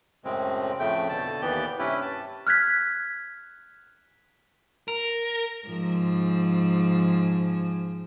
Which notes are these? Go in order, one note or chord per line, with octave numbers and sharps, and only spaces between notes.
F#2 A2 C#3 G#3 C4
F2 A2 C#3 A3 G5
B2 D3 A5
D#2 E3 B3 G4 D5 G6
G2 C3 C#4 E4 G4 B4
A5
F6 F#6 G#6 B6
A#4
G#2 F3